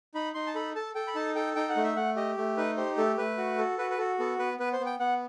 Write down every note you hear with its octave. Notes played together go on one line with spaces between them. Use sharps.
D#4 B5
D#4 C6
A5
A4 B5
A4 A5
A4 G5
B5
D#4 A5
A4 G5
D#4 G5
F#5
A3
E5
A3 F#5
G4 D#5
A3
D#4 B4
G4 C5
A3 A4
A3 B4
F#4
A4
F#4 B4
B4
F#4 A4
B3 A4
B3 B4
B3 B4
C5
B3
G5
B3 F#5